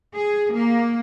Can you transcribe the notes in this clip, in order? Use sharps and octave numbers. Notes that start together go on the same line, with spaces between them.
G#4
A#3